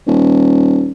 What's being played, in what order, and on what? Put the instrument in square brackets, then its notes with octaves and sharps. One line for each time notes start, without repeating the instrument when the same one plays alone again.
[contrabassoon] D#1